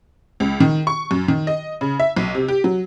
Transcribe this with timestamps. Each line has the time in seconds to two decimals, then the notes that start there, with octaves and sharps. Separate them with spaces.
0.40 C#2
0.60 D#3
0.87 C#6
1.11 F#2
1.28 D#3
1.47 D#5
1.81 C#3
2.00 E5
2.17 B1
2.35 C3
2.48 G4
2.64 F#3